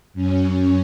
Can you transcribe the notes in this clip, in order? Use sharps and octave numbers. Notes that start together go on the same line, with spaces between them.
F#2 C#4